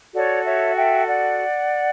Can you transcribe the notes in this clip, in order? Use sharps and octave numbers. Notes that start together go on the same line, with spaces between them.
F#4 A4 C#5 D5
C#5 E5
E5 G5
D5 F#5